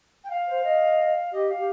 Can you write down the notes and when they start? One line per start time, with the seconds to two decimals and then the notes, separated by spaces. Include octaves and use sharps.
0.24 G5
0.30 F5
0.47 C5
0.63 D#5
1.32 G4 D#5
1.49 F5
1.57 G4